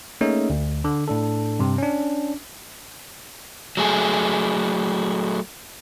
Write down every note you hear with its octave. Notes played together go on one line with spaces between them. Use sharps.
A3 A#3 C#4 D#4 G#4 E5
D2
D3
A2 D4 A4
G2 C3
C#4 D4
F#3 A3 G#4